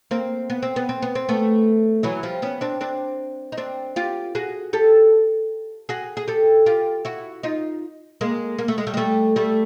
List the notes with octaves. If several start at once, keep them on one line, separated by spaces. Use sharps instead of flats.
A#3 C4
B3
C4
B3
C4
B3
C4
A3 B3
E3 F#3
F3 G3
B3 C#4
C4 D4
C4 D4
D#4
C4 D4
F4 G4
F#4 G#4
G4 A4
F#4 G#4
G#4
G4 A4
F4 G4
E4 F#4
D#4 F4
G#3 A#3
A#3
A3
G#3
G3 A3
G#3
G3 A3
G3 A3